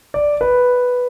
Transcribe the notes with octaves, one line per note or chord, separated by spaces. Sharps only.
D5
B4